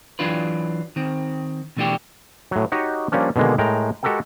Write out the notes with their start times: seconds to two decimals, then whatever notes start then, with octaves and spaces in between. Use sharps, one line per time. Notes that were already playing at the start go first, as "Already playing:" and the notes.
0.19 E3 F#3 D4 F4 B4
0.96 D#3 C4
1.77 B2 E3 A3 D4 F#4 G4
2.51 A2 F#3
2.72 D#4 F#4 G4 C#5 D#5
3.12 F3 G3 A#3 C#4 D4
3.36 B2 D3 D#3 G#3 A#3
3.58 A2 G#3 A#4 G5 A#5
4.03 G#3 F#4 G4 A4 A#4 G5